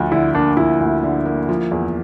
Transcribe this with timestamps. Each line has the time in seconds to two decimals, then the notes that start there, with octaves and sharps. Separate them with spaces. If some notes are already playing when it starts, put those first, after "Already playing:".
Already playing: D2 F3
0.11 D3 E4
0.34 A#3 D4
0.57 F3 E4
0.80 D2
1.03 D3
1.25 A#3
1.49 F3
1.71 E2